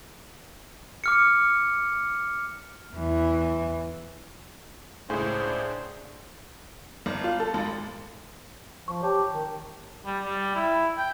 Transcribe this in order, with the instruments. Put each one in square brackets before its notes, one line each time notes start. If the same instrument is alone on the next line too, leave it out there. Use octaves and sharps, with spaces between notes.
[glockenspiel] D6 F6 C#7
[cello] E2 E3
[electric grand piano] C#2 A2 [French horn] D4 [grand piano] G#4 [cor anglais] C5
[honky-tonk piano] G1
F4
A4
G#1
[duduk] F3 [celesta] C#6
[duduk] G4 [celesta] C#5 A5
[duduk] D#3
[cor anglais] G3
G3
E4
G5